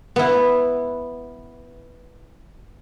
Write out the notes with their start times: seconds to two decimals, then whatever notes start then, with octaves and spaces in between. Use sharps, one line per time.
0.16 B3 E4